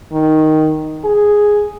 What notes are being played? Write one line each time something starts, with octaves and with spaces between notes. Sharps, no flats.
D#3
G#4